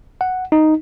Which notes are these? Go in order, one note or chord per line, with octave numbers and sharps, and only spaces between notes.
F#5
D#4